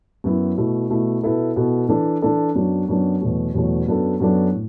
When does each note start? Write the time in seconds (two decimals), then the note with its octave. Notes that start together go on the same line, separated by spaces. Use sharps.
0.24 F#2 F#3 B3 E4
0.57 B2 A3 E4
0.90 B2 A3 E4
1.23 B2 B3 E4 A4
1.56 B2 B3 E4 A4
1.89 E3 D4 A4
2.22 E3 D4 A4
2.55 F#2 F#3 B3 D4
2.89 F#2 F#3 B3 D4
3.21 E2 B2 F#3 A3
3.55 E2 B2 F#3 A3
3.87 F#2 F#3 B3 D4 A4
4.20 F#2 F#3 B3 D4 A4
4.52 A2